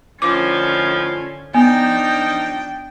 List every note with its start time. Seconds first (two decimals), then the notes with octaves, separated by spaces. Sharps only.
0.22 A2 D3 D#3 F3 C#4 D6
1.54 F3 B3 D4 D#4 G5